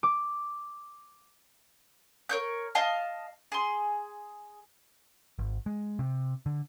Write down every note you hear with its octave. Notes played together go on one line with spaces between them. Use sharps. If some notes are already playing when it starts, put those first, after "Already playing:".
D6
A#4 C#5 G6
D#5 F5 A5 F6
G#4 C6
G#1
G#3
C3
D3